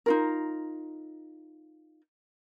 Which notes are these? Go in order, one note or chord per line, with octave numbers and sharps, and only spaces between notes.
D#4 F4 A#4